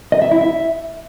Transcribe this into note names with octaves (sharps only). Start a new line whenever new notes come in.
D#5
E5
E4
E5